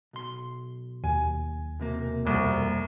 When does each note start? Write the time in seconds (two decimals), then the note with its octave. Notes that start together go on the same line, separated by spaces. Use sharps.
0.13 B1 C6
1.04 D#2 G#5
1.79 B1 C3 A#3
2.25 F1 C2